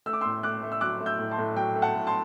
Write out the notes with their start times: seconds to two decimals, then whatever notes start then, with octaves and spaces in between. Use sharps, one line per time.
0.06 A3 E6
0.13 D6
0.21 A2 C6 E6
0.43 A3 D6 F#6
0.63 A3
0.72 E6
0.81 F#3 D6 F#6
1.00 A3
1.06 E6 G6
1.19 A2
1.31 A5 C6
1.38 A2
1.56 F#3 G5
1.75 A3
1.82 F#5 A5
1.95 A2
2.07 A5 C6